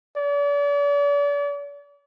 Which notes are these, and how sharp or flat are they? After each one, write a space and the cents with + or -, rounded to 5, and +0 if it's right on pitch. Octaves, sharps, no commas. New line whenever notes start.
D5 -40